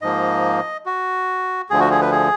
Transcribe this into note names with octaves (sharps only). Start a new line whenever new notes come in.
G#2 F3 A#3 D#5
F#4
D2 D3 F3 G#4
F#4
G#4
B4
G#4